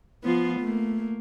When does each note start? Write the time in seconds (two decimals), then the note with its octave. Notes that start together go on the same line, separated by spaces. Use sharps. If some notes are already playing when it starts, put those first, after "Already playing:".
0.23 F3 B3 F4
0.60 A3 A#3